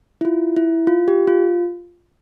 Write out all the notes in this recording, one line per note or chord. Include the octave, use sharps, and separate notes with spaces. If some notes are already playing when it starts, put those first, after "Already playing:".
E4
F4
E4
F4
G4
F4